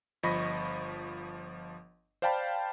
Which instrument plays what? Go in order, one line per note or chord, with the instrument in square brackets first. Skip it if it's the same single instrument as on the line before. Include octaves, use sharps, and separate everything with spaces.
[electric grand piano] G1 F3 D#5 B5 C#6 A#6
C5 D5 F5 G5 A5 B5